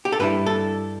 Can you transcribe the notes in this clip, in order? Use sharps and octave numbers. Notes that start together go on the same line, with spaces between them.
G4
A4
G2 G3 E4 B4
A4